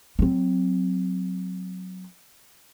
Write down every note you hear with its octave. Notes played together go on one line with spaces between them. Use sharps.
F#3 C4